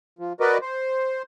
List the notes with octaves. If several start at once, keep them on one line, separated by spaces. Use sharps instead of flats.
F3
F#4 A#4 B4 D5 D#5
C5